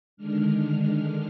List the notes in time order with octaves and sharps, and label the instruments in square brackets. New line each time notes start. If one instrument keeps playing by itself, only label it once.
[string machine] D3 D#3 G#3 D4 F6